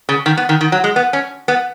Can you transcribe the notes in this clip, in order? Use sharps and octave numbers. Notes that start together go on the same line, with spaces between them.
C#3
D#3
B3
D#3
D#3
F#3
G#3
B3
C#4
B3